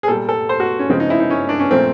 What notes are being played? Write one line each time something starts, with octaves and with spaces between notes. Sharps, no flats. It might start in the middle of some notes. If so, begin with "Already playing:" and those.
G#4
A#2 G3 A4
A4
C5
F#4
C#4
C#3 F3 G#3 C4
D#4
E4
D#4
C#4
D4
C#4
A#2 F3 A3 C4